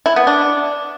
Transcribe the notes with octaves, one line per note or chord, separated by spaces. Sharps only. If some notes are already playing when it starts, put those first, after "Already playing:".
E4
B3
D4